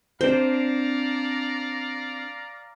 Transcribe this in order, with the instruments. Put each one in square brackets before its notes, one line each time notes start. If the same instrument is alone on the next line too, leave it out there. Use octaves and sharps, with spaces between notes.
[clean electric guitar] C4 D4 [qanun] C5 [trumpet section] D5 F5 A#5